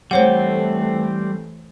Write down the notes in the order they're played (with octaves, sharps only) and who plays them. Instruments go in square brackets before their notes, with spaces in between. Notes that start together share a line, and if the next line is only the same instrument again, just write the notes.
[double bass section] E3 A3 [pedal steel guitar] G3 C4 [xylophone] C5 C#5 F#5